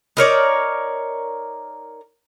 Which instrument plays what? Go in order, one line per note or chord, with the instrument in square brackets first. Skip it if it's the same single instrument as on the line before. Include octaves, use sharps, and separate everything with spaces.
[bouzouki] D#4 A#4 C#5 D5